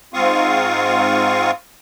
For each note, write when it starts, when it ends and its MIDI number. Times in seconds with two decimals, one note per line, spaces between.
0.14 1.51 44
0.14 1.51 60
0.14 1.51 65
0.14 1.51 77
0.14 1.51 85
0.14 1.51 87